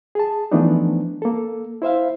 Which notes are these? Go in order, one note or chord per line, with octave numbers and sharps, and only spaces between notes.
G#4 A5
E3 F3 A3 B3 D4 D#4
A#3 A4
E4 C5 E5 F5